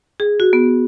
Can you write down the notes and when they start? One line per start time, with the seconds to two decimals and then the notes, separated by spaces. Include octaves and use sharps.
0.20 G#4
0.40 F#4
0.53 B3